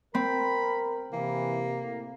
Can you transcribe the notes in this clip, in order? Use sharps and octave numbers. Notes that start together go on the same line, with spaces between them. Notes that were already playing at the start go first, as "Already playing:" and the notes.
C4 A#4 B5
C3 E3 A#3
A2